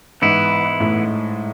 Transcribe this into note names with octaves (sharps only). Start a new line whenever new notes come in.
G#2 E3 B3 E4
A2